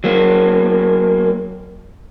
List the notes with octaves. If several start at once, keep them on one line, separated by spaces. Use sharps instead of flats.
F#3 A#3